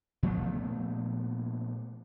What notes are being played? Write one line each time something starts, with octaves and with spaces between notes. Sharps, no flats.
A#2 F3 A3 B3